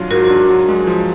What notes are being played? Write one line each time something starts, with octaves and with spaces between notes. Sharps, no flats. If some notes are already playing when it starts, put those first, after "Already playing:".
Already playing: F#3 D4 F4
G#2 F#4 A#4
D4
F#3
G#3
F3